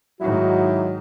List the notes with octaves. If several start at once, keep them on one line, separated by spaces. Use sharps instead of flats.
G#2 D#3 F#3 E4 F#4